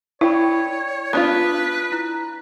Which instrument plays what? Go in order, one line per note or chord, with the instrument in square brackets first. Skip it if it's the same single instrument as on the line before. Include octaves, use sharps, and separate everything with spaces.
[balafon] E4 [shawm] C#5 [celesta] D5 G5 B5
[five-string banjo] B3 D4 F4 [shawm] B4 [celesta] A5 D#6 F#6
[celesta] E4 A#5 F#6